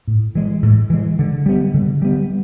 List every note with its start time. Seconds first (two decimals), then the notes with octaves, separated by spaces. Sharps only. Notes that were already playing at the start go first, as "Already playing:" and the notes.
0.08 A2
0.35 E3 G#3
0.63 A2
0.90 E3 G#3
1.19 D3
1.46 G3 B3
1.74 D3
2.02 G3 B3